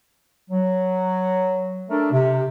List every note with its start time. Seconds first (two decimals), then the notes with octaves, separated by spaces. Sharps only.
0.50 F#3
1.89 A3 D4 A4 A#4
2.12 C3